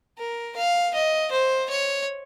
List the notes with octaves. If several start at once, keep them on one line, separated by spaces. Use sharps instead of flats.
A#4
F5
D#5
C5
C#5